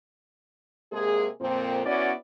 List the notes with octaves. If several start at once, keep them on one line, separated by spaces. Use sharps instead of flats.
C3 G#3 A#3 G#4
F2 A#2 C4
B3 C#4 E4 F#4 D5